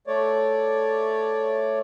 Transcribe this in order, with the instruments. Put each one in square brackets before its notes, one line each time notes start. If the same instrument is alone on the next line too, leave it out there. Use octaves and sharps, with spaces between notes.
[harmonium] A3 C#5 D5